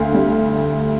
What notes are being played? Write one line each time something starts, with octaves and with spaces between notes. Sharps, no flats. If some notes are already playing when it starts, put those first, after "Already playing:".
Already playing: D2 D3 F5
G3